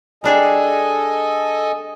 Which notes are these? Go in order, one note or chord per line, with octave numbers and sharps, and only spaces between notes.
G3 D4 G#4 A4 D#5 G#5